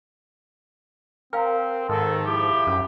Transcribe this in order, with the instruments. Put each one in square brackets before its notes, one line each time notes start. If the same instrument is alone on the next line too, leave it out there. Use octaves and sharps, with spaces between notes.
[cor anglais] C4 [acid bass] A#4 [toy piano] F5 G5
[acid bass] G#2 [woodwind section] D#3 [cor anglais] A4
[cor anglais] F3 [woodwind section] E4 G4
[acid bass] F#2 [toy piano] C#4